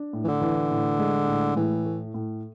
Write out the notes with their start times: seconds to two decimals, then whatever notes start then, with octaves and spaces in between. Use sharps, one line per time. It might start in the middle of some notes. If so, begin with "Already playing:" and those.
Already playing: D4
0.13 A2
0.24 E3
0.28 D3
0.42 E3
0.71 A2
0.99 G#3
1.28 A2
1.56 A2 E3
1.85 A3
2.14 A2